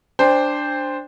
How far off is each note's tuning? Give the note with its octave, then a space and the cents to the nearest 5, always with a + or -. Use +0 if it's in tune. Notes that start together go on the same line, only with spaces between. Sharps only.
D4 +0 C5 +0 G5 +35